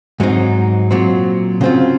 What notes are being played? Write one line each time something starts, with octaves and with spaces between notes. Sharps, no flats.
G#2 F#3 C4 D#4
A#2 F#3 C4
C#3 F#3 C4 F4